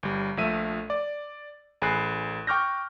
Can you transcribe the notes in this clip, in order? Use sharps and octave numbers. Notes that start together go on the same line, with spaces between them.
G1 G3
A#1 F3 A3 E5 D#7
D5
A1 G#4 G#5 B5 F#6 C7
G5 C#6 D6 F6 G6 A#6